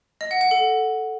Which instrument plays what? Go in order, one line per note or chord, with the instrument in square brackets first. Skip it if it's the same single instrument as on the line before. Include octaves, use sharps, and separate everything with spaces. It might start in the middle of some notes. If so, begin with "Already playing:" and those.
[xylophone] D#5
F#5
F#5
A4